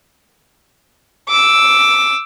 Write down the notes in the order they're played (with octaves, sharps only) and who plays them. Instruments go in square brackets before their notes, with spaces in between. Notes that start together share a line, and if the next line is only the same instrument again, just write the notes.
[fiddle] D6 E6